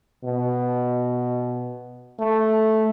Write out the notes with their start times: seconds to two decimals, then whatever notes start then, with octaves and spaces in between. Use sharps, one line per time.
0.24 B2
2.20 A3